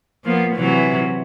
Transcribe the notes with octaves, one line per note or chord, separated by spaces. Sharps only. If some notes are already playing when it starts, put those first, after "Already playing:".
F3 A#3 B3
C3 E3 F#3